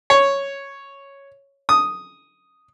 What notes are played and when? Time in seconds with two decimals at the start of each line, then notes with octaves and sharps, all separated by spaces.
0.10 C#5
1.69 D#6